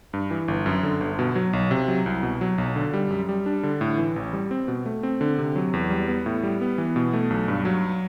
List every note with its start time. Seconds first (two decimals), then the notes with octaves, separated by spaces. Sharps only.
0.13 G2
0.31 E3
0.48 G1
0.66 F#2
0.83 D3
1.01 G1
1.19 B2
1.35 F#3
1.53 B1
1.71 C3
1.88 F#3
2.06 C2
2.23 B2
2.41 F#3
2.58 B1
2.76 D3
2.93 G3
3.10 F#2
3.29 G3
3.46 D4
3.63 D3
3.81 A2
3.98 E3
4.16 A1
4.33 G3
4.51 C4
4.68 B2
4.86 A3
5.03 C4
5.21 D3
5.38 C3
5.56 F#3
5.73 E2
5.90 G3
6.08 B3
6.26 A2
6.43 G3
6.61 B3
6.78 E3
6.96 B2
7.13 A3
7.30 B1
7.48 G2
7.65 F#3